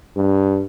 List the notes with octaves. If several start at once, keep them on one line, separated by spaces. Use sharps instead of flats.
G2